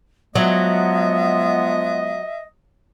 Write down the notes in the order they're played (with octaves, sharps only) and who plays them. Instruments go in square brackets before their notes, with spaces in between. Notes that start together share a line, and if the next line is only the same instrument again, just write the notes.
[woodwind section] F3 G#3 B3 [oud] F#3 [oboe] D#5 [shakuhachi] E5